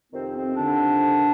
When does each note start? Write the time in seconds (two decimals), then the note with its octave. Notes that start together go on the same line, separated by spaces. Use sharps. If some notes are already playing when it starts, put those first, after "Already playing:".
0.12 F2 C3 D#3 C4
0.34 C4
0.56 D3 D4